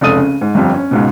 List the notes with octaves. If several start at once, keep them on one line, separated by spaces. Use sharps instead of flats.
F1 C#2 A4 D#6 D#7
C#3
G#2
G1 F2 G4
C#4
C#2 G#2 B2